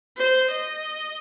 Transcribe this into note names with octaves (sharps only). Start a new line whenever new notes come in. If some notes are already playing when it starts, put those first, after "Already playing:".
C5
D#5